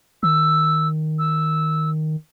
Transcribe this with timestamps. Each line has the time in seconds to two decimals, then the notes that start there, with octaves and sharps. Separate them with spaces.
0.23 D#3 E6
1.19 E6